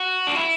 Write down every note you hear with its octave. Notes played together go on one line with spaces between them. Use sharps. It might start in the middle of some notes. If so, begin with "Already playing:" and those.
Already playing: F#4
D4
E4